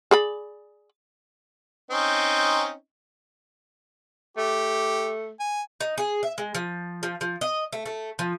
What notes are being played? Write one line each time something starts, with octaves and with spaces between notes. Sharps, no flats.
G#4 D5 B5
C4 C#4 D#4
A3 G4
G#5
D#4
G#4
E5
G#3
F3
F3
F3
D#5
A3
A3
F3